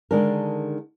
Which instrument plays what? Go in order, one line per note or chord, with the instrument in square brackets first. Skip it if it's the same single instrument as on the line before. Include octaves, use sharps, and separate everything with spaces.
[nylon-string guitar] D3 D#3 G#3 D4 G#4 A#4